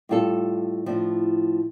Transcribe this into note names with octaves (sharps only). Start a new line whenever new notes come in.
A2 G3 F4 A4
A2 F3 D4